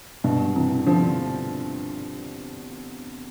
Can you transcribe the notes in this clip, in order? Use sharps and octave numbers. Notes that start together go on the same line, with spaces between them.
G2 B2
C3 E3
D3 F3